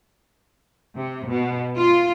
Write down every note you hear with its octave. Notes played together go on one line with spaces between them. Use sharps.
C3
B2
F4